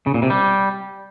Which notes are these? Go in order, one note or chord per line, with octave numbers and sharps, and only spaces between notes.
C#3
A#2
C3
G3